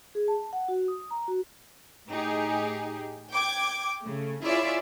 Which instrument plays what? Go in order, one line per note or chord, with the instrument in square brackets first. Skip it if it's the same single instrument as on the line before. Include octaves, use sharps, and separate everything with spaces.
[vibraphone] G#4
A5
F#5
F#4
D#6
A#5
F#4
[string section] A2 D#4 G4 G#4
G5 D6 G#6
C#3 A3
E4 F4 G#4 C#5 D5 E5